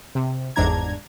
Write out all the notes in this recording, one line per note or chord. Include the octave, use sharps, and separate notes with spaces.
C3
G1 E2 G#2 D4 A#5 G#6